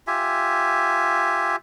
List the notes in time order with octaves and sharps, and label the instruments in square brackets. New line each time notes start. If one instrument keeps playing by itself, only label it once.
[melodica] F4 G4 E5 G#5